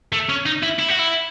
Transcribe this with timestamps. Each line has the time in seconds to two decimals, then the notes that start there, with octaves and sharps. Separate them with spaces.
0.12 A3
0.29 C#4
0.46 D#4
0.63 E4
0.79 E4
0.89 F#4
0.99 E4